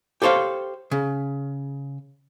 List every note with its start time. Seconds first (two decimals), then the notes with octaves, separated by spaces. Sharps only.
0.22 G4 A4 C5 C#5 F5
0.91 C#3